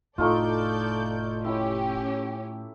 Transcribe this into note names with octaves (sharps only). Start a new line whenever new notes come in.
F1 A2 A3 D#4 F4 A4 D5 G6
C#4 E4 G4